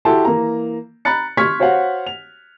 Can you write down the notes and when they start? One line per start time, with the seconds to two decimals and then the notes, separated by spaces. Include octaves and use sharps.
0.05 E4 F#4 G4 A4 A5 C6
0.25 E3 A#3 A#5
1.05 A#5 B5 F#6 A6 C#7
1.37 C6 C#6 F6 G#6 B6
1.59 F#4 C5 C#5 F5 F#5
2.07 F7